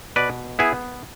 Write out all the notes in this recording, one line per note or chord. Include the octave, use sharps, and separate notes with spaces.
B2 B4 D5
B3 E4 G#4